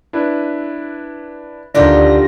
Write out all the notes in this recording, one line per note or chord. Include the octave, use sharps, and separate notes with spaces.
D4 E4 B4
D2 D3 D#3 D4 F4 G4 D5 A#6